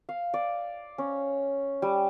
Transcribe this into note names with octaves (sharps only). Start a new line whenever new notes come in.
F5
D5
C#4
G3